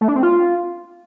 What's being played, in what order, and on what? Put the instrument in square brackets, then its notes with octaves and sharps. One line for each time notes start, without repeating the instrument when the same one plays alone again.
[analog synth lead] A3
D4
C4
F4